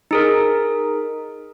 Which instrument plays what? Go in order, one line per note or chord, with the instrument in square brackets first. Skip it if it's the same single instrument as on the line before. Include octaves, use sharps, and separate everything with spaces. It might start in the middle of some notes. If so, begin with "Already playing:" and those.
[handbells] D#4 G#4 A#4